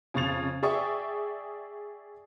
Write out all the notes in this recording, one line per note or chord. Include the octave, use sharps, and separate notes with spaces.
F2 C#3 C#6 A6 F7
G#4 D5 E5 G5 C#6 D#6